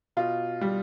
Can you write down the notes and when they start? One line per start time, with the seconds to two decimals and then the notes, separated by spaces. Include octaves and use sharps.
0.17 B2 F4
0.61 G3